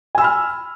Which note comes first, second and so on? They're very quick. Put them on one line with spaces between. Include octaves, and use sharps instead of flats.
G#5 E6 B5 F6